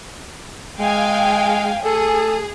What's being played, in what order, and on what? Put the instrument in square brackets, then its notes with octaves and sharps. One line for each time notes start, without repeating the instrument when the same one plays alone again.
[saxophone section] G#3 [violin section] F5 G5 G#5
[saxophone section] A3 A4 [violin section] G#4